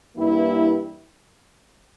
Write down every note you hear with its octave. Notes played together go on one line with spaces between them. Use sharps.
G2 E3 A#3 E4 G4